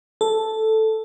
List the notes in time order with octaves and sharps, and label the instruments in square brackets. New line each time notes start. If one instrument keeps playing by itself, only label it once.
[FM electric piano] A4